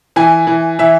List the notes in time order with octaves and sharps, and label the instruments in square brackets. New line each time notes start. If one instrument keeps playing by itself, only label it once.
[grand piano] E3 G#5
E3
E3 E5